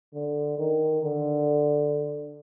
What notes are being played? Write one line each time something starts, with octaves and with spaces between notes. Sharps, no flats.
D3
D#3
D3